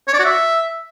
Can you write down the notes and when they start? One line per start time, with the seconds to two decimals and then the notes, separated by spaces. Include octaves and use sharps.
0.08 C#5
0.14 D5
0.19 F#4
0.25 E5